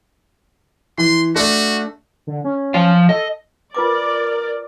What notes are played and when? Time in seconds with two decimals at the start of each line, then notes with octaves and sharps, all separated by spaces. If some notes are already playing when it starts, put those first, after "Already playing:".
0.98 E3 C6
1.35 A3 D4 F#4
2.27 D3
2.44 C#4
2.74 F3 F4 F5
3.09 A4 D#5
3.75 F4 A#4 B4 D5 D6